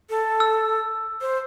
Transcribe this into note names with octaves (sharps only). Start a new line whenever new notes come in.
A4
E6
C5